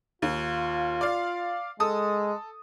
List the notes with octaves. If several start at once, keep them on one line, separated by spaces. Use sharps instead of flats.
D#2 F4
D5 F5
G#3 A4 D#6